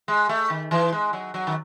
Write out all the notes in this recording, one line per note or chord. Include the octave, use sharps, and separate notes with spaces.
G#3
A3
D#3
E3
G#3
F#3
F#3
D#3